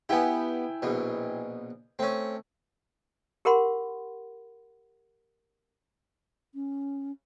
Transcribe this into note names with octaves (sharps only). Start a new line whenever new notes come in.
B3 E4 G4 G5 G#5
A#1 B2
A3 C4 C#4
G4 A#4 F#5 B5 C6
C#4